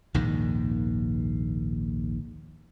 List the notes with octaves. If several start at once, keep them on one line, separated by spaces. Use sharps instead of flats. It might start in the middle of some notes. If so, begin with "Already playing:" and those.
A#1 D#2 G#2 D#3